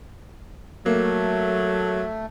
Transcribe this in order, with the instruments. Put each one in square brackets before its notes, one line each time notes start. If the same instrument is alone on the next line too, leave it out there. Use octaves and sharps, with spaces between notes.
[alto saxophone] F#3 [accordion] A3 [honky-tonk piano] A#3